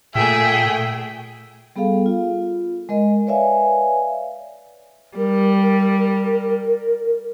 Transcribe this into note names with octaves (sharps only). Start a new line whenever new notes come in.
A#2 A3 G#4 E5 G5
G3 B3 G#4 A4 F5
F4
G#3 A#4 D#5
B4 C#5 D5 E5 F5 G#5
G3 A#4